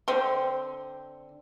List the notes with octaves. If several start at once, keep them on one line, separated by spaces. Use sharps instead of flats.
D3 C4